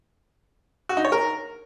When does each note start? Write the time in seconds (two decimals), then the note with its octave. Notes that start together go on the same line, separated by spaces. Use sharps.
0.89 F#4
0.97 D#4
1.05 C#5
1.12 A#4